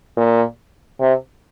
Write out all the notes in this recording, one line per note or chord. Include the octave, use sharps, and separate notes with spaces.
A#2
C3